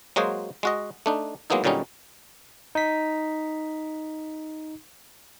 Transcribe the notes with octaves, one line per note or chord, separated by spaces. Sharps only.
F#3 G#3 A#3 F#4 G#4 C5
G#3 F#4 D#5
A3 D4 D#4
F#3 G#3 A#3 B3 D#4 E4
A#2 D3 F#3 G3 C#4 D#4
D#4 B6